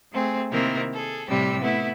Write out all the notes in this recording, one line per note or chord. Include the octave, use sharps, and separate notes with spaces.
A3 C4 G#4
C3 D#3 A#3 C4 E4 A#4
G#4 A4
A2 C3 G3 G4 E6
A3 B3 E4